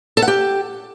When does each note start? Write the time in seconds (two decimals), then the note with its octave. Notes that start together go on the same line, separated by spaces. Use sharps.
0.17 A4
0.22 F#5
0.28 G4